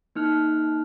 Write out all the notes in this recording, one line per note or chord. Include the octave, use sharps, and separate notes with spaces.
A#3 D#4 F6 F#6